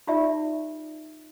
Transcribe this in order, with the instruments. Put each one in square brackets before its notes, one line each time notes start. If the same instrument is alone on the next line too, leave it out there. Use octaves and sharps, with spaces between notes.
[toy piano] D#4 F4 G4 D5 E5